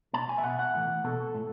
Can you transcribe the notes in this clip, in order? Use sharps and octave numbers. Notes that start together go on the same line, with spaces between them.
B2 A5
G#5
E5
B2 F#5
F#5
A2 E3
B2 A4
A2